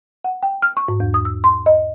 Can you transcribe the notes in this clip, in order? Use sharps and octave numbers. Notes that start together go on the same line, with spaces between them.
F#5
G5
F6
C#6
G#2
E2
D#6
E6
C6
D#5